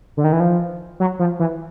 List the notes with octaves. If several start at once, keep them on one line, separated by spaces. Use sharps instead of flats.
D3
D#3
E3
F3
F#3
F3
E3